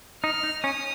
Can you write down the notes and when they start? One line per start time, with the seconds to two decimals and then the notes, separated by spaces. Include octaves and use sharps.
0.24 D#4 F6
0.43 D#4
0.64 C#4 D#6